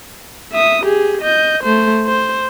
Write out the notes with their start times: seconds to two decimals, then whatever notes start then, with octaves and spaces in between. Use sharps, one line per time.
0.52 E5 D#6
0.84 G4 G#4
1.22 D#5 G6
1.63 A3 C5
2.07 C5